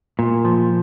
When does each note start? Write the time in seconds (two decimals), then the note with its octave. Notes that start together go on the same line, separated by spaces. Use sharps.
0.19 A#2
0.45 F3